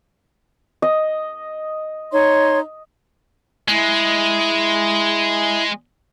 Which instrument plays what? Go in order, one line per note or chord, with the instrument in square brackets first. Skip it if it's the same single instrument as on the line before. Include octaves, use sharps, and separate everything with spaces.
[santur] D#5
[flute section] D#4 C#5 C6
[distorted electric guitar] G#3 [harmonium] E4